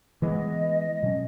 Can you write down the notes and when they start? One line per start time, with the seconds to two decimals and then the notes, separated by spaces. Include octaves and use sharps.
0.21 E3 G#3 B3 D#5
1.03 B2 F#3 C#4